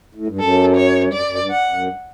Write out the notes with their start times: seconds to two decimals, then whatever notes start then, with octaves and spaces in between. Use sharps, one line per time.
0.15 A2
0.27 G2
0.39 F#2 A4
0.76 C#5
1.02 G2
1.13 F#2 D5
1.26 F#2
1.38 G2
1.51 F#5
1.69 F#2
1.87 G2